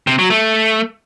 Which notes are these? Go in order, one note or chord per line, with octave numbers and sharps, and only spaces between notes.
C3
F#3
A3